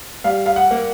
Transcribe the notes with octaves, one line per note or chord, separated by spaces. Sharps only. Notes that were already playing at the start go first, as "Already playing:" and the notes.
G3 F5
F5
F#5
A#3